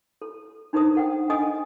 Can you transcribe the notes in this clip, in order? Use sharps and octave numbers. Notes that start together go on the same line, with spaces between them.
A4
D4 D#4 A4 A#4 C5 D#6
A4 F#5 G5
D4 A4 D#5 G#5 D#6